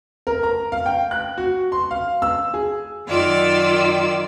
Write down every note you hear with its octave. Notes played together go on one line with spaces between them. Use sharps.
A#4
A#5
F5
G5
F#6
F#4
C6
F5
E6
G#4
F#2 D#3 F4 D5 E6